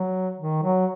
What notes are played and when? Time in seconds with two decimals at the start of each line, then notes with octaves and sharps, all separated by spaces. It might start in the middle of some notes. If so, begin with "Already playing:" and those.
Already playing: F#3
0.37 D#3
0.63 F#3